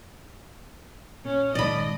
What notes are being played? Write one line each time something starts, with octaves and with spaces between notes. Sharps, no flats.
A#2 C#4
G1 A#2 D#3 G#3 D5 D#5 A5 B5